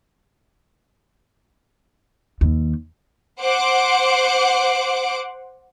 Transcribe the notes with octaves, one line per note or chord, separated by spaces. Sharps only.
D#2
C5 F#5 D6